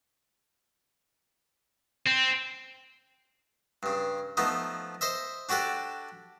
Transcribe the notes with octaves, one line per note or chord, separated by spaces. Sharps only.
C4
G2 C#3
F3 A3 B3 D#4
C5 D#5 E5
D4 F#4 G4 A4 D5